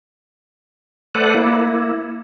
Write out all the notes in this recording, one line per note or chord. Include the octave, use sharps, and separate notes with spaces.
A3 A4 B4 C5 D5 F#5
A#3 E4